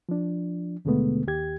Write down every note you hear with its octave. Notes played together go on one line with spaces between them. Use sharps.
F3 D4
D#2 B2 D3 G#3 A3 B3
D#2 G4 G#6